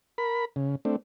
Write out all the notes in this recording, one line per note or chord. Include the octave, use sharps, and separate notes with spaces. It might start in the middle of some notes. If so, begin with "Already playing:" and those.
A#4 B5
C#3
A3 C4 D4